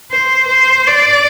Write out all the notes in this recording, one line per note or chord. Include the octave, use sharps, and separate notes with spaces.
C5
C5
D5